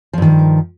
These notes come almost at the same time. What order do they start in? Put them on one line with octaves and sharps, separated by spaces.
F3 G2 D#3